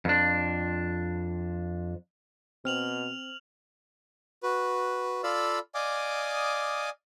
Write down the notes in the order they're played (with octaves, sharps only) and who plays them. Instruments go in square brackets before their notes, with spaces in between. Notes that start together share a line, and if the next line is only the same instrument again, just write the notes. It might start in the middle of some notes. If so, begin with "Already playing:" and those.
[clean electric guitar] F2 D4
[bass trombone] B2 [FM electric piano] C4 [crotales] F6 F7 F#7
[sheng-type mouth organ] F#4 B4
F4 A4 D5 F5 B5 E6
D5 D#5 F5 G#5 D6 D#6